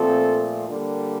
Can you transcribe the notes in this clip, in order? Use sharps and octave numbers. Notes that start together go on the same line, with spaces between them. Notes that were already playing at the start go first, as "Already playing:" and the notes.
Already playing: A#2 F3 A3 C4 A4
D3 G3 A#3